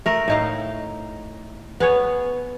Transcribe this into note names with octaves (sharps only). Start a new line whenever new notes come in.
A3 A#4
A2 D#4 F5
B3 G#4 C#5